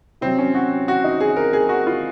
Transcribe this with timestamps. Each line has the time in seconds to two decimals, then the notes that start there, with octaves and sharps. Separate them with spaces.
0.21 C3 F#3 C4
0.38 C#4
0.54 F#4
0.88 F#4
1.04 D#4
1.20 G#4
1.36 A#4
1.53 G#4
1.69 F#4
1.87 F4